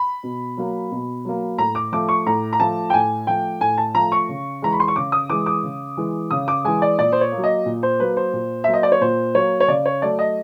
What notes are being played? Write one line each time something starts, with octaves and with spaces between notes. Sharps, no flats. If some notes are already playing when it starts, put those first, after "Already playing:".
Already playing: B5
B2
F#3 A#3
B2
F#3 A#3
A2 A#5
D6
F3 A3 D6
C#6
A2 A#5
A#5
F3 A3 A5
G5
A2 G#5
F3 A3 G5
A2 G#5
A5
F3 A3 A#5
C#6
C#3
E3 G#3 A#5
B5
C6
C#6
C#3 D6
D#6
E3 G#3 D6
D6
C#3
E3 G#3
C#3 D#6
D6
E3 G#3 G#5
D5
A#2 D5
C5
C#5
A#3
F#3
D#5
A#2
C5
F#3 A#3 B4
C5
A#2
F#3 A#3 E5
D#5
D5
C#5
A#2 C5
F#3 A#3 C#5
C#5
C#3 D5
C#5
F#3 A3 D5
D#5